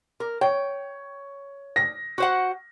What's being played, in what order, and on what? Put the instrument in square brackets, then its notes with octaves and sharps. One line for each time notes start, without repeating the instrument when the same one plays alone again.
[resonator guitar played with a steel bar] A#4
[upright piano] C#5 [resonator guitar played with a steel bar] G5
[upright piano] A#6
[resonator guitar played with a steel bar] F#4 C5 F#5